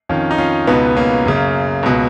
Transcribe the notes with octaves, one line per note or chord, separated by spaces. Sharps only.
F2 D#3 C#4 F4
D#4
C#4 F4
C#2 B2 B3 D#4
A#3 C#4
F#2 C#3
C#2 B2